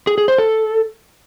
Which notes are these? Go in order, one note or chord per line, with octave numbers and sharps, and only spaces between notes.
G#4
G#4
C5
A4